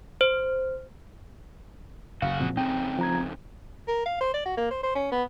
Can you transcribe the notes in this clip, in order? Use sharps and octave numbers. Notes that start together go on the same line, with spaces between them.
C5
F#1 C#3 F#4 F5
A#2 F3 C4
F2 C#3 C4 D#4 G5
F3 A#5 G#6
A#4
F5
C5
D5
F#4
A#3
C5
C5
C#4
B3